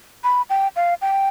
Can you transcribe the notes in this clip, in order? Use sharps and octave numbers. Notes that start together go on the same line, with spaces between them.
B5
G5
F5
G5